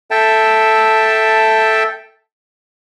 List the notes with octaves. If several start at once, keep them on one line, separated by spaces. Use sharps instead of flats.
A4 E5 G5 A5